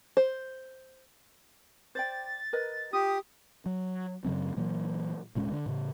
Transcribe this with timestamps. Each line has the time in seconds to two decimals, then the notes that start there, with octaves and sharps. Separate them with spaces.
0.17 C5
1.95 C5 D5 G5 A6
2.53 A#4 B4 D#5
2.93 F4 G4 D#6
3.66 F#3
4.25 F#2 C#3 F#3 C4
4.57 A#2 E3 F#3 A#3
5.35 E1 A#2 G#3 C#4
5.51 D3 D4
5.66 A2 C#3